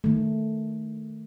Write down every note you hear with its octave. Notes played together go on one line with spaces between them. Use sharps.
D#3 A3